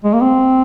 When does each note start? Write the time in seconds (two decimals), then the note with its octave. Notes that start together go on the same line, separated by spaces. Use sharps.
0.04 G#3
0.13 A#3
0.21 C4